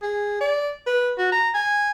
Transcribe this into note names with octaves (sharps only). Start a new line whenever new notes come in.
G#4
D5
B4
F#4
A#5
G#5